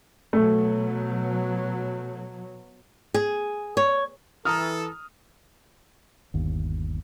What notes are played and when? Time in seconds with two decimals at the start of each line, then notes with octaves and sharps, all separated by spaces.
0.33 B2 F#3 A3
3.14 G#4
3.77 C#5
4.45 E3 A4 A#5 D#6 F6
6.34 G1 D#2